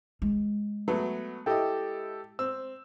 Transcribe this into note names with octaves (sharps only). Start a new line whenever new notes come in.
G#3
F#3 A3 B3
E4 G4 A4 D#5 G5
C4 E6